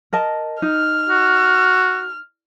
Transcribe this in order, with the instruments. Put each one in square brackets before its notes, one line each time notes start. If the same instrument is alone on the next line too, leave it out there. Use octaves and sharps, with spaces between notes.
[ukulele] A#4 D#5 A5
[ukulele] D#4 [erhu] F6
[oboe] F#4